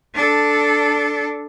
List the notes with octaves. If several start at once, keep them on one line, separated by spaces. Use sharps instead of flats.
D4 A4